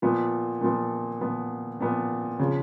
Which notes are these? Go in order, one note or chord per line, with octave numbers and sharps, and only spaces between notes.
A#2 F3 B3
A#2 F3 B3
A#2 F3 B3
A#2 F3 B3
C#3 F3